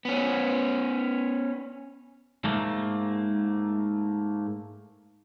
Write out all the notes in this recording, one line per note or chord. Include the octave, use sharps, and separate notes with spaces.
B3 C#4
G#2 A3 A#3